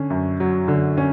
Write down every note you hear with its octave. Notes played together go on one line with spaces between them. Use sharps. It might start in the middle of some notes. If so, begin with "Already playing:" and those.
Already playing: D3 C#4
F#2
F#3
D3
C#4